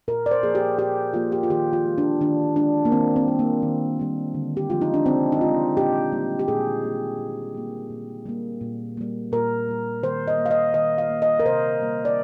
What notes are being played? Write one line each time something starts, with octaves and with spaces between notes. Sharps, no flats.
A#2 A#4
D5
C5
F3 A#3 G#4
G4
A#2 G4
F3 A#3 F4
G4
F4
D#3 G4
F4
G#3
D4
D#3 D4
G#3 D4
A#3
D#3 C4
C4
G3 A#3
A#3
D#3
G3 A#3
D3
G4
F3 G#3 F4
D#4
D4
D3 C4
D#4
F3 G#3 F4
A#2 G4
G3 A#3
G4
A#2 G#4
G3 A#3
A#2
G3 A#3
A#2
G3 A#3
A#2
G3 A#3
A#2 A#4
G3 A#3
D#3 C5
D#5
A#3
F5
D#5
D#3 D#5
F5
A#3
D#5
A#4
C3 C5
G3 A#3
D5